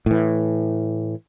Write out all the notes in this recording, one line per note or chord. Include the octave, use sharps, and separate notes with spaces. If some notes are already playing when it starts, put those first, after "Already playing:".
A2 E3